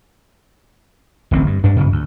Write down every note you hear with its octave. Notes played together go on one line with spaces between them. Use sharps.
D1 A1 C4
G2
G2 D4
G2 C#3
D2